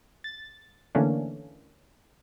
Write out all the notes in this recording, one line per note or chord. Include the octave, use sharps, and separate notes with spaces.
A6
D3 E3 A3 A#3 C#4 D4